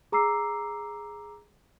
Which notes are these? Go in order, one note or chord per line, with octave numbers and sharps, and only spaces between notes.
G#4 A#5 D6 E6 C7